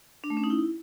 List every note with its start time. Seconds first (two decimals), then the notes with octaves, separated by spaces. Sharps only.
0.24 D4
0.30 A3
0.37 C#4
0.44 D#4
0.50 E4